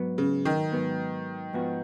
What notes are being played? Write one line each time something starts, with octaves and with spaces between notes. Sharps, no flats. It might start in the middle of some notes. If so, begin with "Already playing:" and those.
Already playing: G#2 F#3 B3
C#3
D#3
G#2 F#3 B3
G#2 F3 B3 F#4